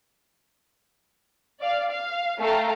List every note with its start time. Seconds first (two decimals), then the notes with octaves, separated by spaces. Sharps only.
1.61 D5 F5
1.91 F5
2.40 A3 A4 F5 G5 A#5